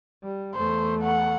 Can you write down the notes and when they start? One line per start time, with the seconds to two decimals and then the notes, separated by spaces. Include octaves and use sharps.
0.23 G3
0.55 E2 A3 C5
1.03 F#5